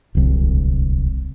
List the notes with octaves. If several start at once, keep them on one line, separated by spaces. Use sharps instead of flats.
D1 C2